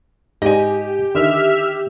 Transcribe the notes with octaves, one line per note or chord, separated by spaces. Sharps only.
G#2 G4 D#5 G#5
D3 D#3 E5 F6